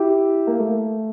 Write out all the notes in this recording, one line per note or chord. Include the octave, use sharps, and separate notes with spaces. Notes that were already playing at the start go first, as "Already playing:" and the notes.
Already playing: E4 G4
A#3
A3